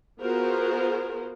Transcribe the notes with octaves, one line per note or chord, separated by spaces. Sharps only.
B3 F4 F#4 G#4 A#4 C5